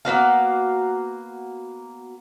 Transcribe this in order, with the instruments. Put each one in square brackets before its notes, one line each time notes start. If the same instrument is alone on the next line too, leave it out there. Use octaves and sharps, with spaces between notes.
[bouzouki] A#3 B3 F#4 F5